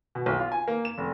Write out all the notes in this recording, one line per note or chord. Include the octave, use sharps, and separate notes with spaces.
B2
B1
F4
G#5
A#3
E7
F1